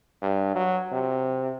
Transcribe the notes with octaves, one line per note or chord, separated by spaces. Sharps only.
G2
F#3
C3